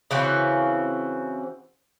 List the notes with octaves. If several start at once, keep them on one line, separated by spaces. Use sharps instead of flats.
C#3 E3 C4 F#4